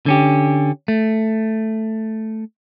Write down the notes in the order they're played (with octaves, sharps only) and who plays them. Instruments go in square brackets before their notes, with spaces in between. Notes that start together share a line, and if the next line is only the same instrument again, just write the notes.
[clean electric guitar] D3 C#4 G4
A3